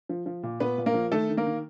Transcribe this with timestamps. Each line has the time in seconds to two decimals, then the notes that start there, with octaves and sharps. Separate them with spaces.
0.09 F3
0.26 F3
0.43 A#2
0.60 A#2 B3 B4
0.78 A#2
0.86 A#3 A#4
0.94 F3
1.12 D#3 A3 A4
1.29 D#3
1.37 A#3 A#4
1.46 D#3